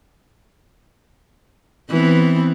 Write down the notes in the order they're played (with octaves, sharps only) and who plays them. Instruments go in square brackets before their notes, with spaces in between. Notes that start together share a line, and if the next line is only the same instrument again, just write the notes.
[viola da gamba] E3 B3 C4